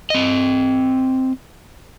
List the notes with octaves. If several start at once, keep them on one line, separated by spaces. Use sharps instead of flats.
C4 D#5